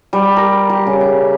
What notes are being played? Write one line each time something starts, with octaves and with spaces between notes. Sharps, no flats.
G3
A#4
G4
C#3
E5